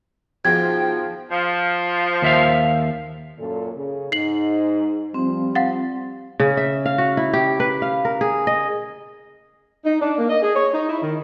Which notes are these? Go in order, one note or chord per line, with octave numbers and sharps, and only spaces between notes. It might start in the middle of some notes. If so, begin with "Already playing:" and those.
G#2 B2 F3 G5 G#6
F3
D#2 E5 F5
F#2 A#2 A4
C#3
G#2 D#4 C7 F#7
F3 G3 C4
F5 F#5 A6
C#3
E5
F5
F#4
E4
G4
B4
F5
A#4
G#4
D#5
D#4
D4
A#3
D#5
G#4
C#5
D#4
E4
D#3